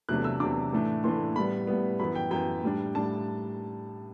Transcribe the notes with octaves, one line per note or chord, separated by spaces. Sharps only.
E2 C3 F#3 A3 D4 F#6
E6
E2 C3 F#3 A3 D4 D6
A2 E3 A3 D4
A2 E3 A3 D4 C6
A2 G3 B3 B5
A2 G3 B3
F#2 E3 B3 B5
G5
F#2 E3 B3 G5
A2 G3 D4
A2 G3 D4 A5